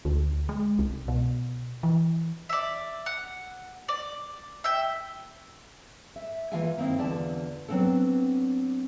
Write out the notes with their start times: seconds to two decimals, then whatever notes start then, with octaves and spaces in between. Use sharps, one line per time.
0.05 D2
0.49 G#3
0.79 C2
1.08 B2
1.83 E3
2.49 D5 E5
3.06 F#5
3.89 D5
4.64 E5 G5
6.16 E5
6.52 E3 A#3 F4 E5 F5 G#5
6.77 D#3 A#3 C4 D#4 E4
6.99 E2 D3 F4 D5 A5
7.68 F#3 B3 C4 D4 A4